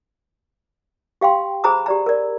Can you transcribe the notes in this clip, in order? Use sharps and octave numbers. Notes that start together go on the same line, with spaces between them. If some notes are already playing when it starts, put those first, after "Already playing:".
G4 F5 G5 C6
G#4 C5 A#5 B5 D#6
G4 D5 A#5
A#4 D5